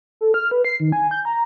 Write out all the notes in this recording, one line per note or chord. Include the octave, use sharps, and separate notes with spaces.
A4
F6
B4
C7
D#3
G#5
G6
A#5